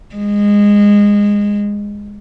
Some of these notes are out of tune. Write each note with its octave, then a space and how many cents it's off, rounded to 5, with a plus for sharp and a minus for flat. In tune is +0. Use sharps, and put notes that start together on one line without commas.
G#3 -20